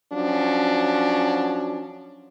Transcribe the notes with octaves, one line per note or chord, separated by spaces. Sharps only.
F3 F#3 C#4 D4